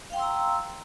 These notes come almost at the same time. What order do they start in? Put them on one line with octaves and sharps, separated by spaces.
F5 G5 C6 E6 A#5